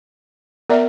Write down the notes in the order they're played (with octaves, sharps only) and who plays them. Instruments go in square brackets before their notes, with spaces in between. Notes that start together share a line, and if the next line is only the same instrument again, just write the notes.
[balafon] B3 D5 E5 [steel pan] A#4